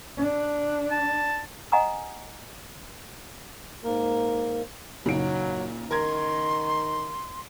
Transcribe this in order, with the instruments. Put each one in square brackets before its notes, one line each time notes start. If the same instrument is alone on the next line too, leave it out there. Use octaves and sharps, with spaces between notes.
[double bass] D4
[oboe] A5
[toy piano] D#5 F#5 G#5 A#5 D#6
[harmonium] G#2 A#3 A#4
[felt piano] F#1 D#4 D7 [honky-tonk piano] A#2 [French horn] F#3
[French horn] D#3 [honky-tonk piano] A#4 G#6 [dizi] C6